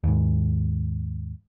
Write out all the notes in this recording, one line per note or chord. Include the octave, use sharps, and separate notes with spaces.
D#2 G#2